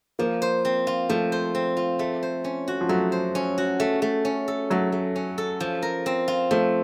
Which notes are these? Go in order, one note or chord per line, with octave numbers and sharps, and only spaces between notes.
F3 A#3
C5
C4
F4
F3 A3
C5
C4
F4
A3
C5
C#4
F#4
F3
F#3 A3
C5
C#4
F#4
A3
A3
C#4
A4
F#3 A3
A3
C#4
A4
F3
A#4
C4
F4
F3 A3